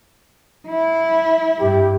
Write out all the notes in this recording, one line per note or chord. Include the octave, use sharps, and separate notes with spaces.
E4
G2 G4